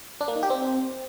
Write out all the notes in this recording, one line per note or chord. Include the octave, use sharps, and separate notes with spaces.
D4
A#3
D#4
G4
C4